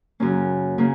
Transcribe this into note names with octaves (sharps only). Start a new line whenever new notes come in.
F#2 C#3 A#3 C#4
C#3 A#3 C#4